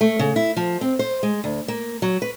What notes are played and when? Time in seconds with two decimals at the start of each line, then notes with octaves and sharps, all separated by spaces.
0.01 A3
0.19 C#3
0.36 E4
0.57 F3
0.81 C4
0.99 C5
1.23 G#3
1.44 D2
1.68 A#3
2.02 F#3
2.22 B4